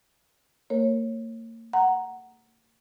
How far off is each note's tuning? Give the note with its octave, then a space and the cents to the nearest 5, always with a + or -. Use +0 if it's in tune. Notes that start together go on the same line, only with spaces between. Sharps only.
A#3 -40 A#4 +0 C#5 -20
F#5 +5 A#5 +0